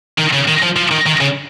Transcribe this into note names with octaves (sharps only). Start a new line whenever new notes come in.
D#3
C#3
D#3
F3
F3
D#3
D#3
C#3